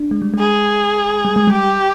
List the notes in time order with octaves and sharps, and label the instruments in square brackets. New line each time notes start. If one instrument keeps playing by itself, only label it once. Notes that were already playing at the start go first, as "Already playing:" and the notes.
Already playing: [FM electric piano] D4
G#3
G3
G#3
[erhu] G#4
[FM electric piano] G3
G#3
G3
[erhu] G4